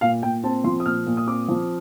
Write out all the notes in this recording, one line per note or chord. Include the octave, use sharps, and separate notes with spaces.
A#2 F5
A#2 G5
C4 A5
F3 C6
D#6
A#2 F6
A#2
D#6
C4 D6
F3